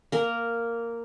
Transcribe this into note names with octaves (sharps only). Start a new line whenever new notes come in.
A#3 A#4